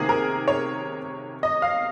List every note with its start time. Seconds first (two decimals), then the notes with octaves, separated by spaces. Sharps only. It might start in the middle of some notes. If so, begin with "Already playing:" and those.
Already playing: C3 D#3 A#3 G#4
0.09 A#4
0.48 C#5
1.43 D#5
1.62 F5